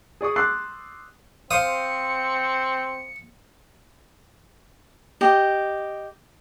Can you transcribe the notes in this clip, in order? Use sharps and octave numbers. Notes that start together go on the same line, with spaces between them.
G#4 D5 C#6 D#6
C6 D6 E6 F#6 A6 C7
C4 C5 F5 D#6 C#7
G4 D#5